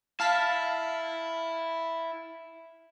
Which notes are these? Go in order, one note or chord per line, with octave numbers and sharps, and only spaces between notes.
E4 F5 A5 B6